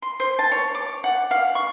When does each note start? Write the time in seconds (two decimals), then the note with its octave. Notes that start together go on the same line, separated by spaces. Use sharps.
0.02 C6
0.20 C5
0.39 A5
0.52 C#5
0.75 D6
1.04 F#5
1.31 F5
1.55 C#6